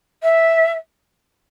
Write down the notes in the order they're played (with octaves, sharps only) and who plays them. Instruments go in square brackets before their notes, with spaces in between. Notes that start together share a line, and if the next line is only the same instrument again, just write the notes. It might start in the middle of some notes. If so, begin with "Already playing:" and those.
[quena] E5